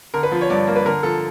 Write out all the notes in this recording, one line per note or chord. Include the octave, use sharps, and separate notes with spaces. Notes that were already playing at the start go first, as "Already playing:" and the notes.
D3 A#4
B4
F3
C#5
G2 D5
A#3
B4
D3 A#4
F3 A4